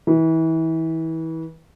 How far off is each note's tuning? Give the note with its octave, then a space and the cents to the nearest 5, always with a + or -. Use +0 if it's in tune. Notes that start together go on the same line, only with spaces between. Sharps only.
E3 -30